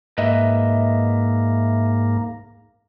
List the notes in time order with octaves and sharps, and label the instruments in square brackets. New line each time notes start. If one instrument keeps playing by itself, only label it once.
[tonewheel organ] G#2 A#3 [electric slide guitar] B4 D#5 E5